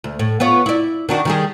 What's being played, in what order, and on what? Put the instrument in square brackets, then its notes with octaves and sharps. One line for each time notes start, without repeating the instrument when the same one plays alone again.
[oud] D2
A2
B3 F4 C#5
E4 D5
D#3 D4 F#4
D#3 G3 G#4